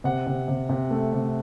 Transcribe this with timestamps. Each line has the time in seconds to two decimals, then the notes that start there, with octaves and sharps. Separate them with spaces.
0.04 C3 F#5
0.26 C3
0.48 C3
0.69 C3
0.91 A3
1.13 C3